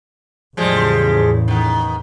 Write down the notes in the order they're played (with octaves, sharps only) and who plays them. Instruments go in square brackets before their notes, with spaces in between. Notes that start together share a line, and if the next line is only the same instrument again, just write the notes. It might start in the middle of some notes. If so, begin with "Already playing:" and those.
[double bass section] E2 A2 C#3 [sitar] F3 G3 G#3
[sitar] D#3 B3